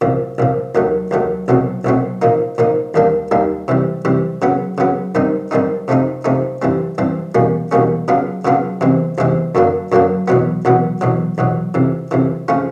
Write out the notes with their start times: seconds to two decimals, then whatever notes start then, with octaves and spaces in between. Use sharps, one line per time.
0.01 C2 A#2 F3
0.38 C2 A#2 F3
0.75 D#2 D#3 F#3 A3
1.11 D#2 D#3 F#3 A3
1.48 C2 B2 F#3 A3 C4
1.85 C2 B2 F#3 A3 C4
2.22 A#2 F3 A#3 D#4
2.58 A#2 F3 A#3 D#4
2.94 D#2 D#3 G3 A#3 D4
3.31 D#2 D#3 G3 A#3 D4
3.68 C3 E3 G3
4.05 C3 E3 G3
4.42 C#3 F#3 B3
4.78 C#3 F#3 B3
5.15 G2 D#3 G3 C4 D#4
5.51 G2 D#3 G3 C4 D#4
5.88 C3 F3 A3 C4 D#4
6.24 C3 F3 A3 C4 D#4
6.62 G2 E3 G3 C4
6.98 G2 E3 G3 C4
7.35 E2 B2 G3 A#3 C#4
7.71 E2 B2 G3 A#3 C#4
8.08 C#3 F#3 B3 D4 F4
8.45 C#3 F#3 B3 D4 F4
8.81 E2 C3 E3 G#3 C4
9.18 E2 C3 E3 G#3 C4
9.55 F#2 D3 F#3 A#3 D4
9.92 F#2 D3 F#3 A#3 D4
10.28 E2 B2 F#3 B3
10.65 E2 B2 F#3 B3
11.01 E2 B2 F#3
11.38 E2 B2 F#3
11.74 F2 C3 E3
12.11 F2 C3 E3
12.48 C#3 F3 A3 C#4 F4